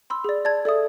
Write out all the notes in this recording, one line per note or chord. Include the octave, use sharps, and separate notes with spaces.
B5 C6 E6
G#4 D5
D5 A5 G#6
A4 D5 E5 D#6